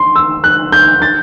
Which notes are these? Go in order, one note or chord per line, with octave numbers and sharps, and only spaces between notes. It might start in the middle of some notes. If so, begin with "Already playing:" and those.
Already playing: C6
E6
F#6
G6
A6